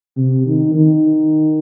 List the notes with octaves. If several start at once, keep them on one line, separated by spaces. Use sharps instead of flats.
C3
D#3
D#3